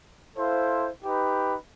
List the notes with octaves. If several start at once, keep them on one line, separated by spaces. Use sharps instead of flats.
E4 A4 C5 F5
D#4 G4 B4